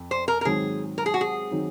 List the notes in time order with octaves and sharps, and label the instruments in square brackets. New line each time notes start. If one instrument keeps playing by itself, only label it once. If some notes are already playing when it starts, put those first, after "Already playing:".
Already playing: [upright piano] F2
[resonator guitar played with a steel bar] C5
A#4
A#4
[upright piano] G#2 D#3 F#3 C4 [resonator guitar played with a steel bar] G#4
[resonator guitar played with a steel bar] A#4
G#4
F#4
G#4
[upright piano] D#3 F#3 C4 D#4